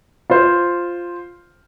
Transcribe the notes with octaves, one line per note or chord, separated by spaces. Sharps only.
F4 C5